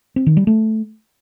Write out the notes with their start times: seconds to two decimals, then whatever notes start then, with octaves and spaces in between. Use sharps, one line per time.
0.16 C4
0.27 D#3
0.37 G3
0.47 A3